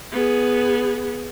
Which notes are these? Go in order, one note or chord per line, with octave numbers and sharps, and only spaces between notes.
B3 G#4